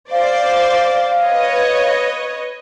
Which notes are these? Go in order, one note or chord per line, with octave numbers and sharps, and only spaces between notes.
C5 D5 F5
B4 C#5 D#5